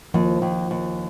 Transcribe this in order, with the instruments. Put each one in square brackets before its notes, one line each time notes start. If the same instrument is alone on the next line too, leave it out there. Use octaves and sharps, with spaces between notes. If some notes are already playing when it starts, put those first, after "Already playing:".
[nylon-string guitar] D#2 [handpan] F3
[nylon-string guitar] D#2
D#2